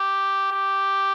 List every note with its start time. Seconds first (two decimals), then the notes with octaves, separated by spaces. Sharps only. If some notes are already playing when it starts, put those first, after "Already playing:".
Already playing: G4
0.52 G4